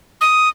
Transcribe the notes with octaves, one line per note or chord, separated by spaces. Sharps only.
D#6